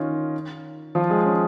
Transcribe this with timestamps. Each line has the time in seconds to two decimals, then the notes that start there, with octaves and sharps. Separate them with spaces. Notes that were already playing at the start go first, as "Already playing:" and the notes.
Already playing: D#3 C#4 D#4 F4
0.95 F3 F4
1.10 G#3 G#4
1.25 C#4